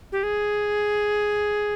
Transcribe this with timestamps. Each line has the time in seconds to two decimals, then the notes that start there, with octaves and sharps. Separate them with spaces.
0.12 G4
0.23 G#4